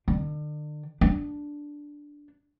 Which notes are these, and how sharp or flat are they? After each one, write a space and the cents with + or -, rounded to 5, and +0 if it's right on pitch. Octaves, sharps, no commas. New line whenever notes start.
D3 +35
D4 -5